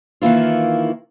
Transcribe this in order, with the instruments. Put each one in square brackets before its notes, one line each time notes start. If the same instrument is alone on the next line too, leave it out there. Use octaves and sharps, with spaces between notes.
[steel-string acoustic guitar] D#3 E3 A#3 E4 F4